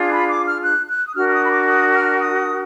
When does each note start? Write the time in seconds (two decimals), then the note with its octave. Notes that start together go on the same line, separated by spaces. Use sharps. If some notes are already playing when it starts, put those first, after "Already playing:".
Already playing: D4 F4 G#4
0.11 B5
0.29 D6
0.45 F6
0.63 F#6
0.89 F#6
1.06 D#6
1.15 D4 F#4 A#4 F6
1.28 F6
1.32 D#6
1.43 B5
1.49 D6
1.66 D#6
1.93 F6
2.18 D#6